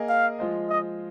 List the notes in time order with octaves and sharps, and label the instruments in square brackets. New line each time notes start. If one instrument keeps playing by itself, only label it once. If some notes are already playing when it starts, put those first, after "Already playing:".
Already playing: [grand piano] A#3 G#4 D#5
[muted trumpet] F5
[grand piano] F3 G#3 F4 C5 D#5
[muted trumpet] D#5